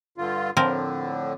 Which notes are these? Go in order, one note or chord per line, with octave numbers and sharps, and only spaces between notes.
G2 D3 F4
A2 D3 F3 C4 A#4